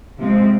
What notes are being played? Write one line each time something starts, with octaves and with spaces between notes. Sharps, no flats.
C3 F3 G#3 C4